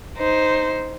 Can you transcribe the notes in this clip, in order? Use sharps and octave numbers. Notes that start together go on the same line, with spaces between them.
D#4 C5